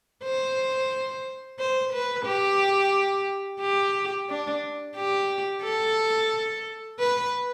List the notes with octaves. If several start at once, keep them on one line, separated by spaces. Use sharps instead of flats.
C5
C5
B4
G4
G4
D4
G4
A4
B4